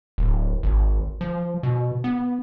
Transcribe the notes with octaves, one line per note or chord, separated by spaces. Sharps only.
D1
G#1
F3
B2
B3